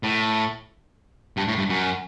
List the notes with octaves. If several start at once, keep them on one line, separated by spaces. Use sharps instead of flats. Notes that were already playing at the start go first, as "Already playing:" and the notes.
A2
G2
A2
G2
F#2